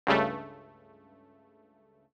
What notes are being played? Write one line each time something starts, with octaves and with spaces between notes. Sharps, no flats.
C#2 G2 C#3 A3